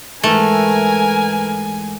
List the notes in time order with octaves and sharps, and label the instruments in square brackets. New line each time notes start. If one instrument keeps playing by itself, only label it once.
[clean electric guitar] G#2 E3 [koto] A3 [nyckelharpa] A#4 B4 [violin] G#5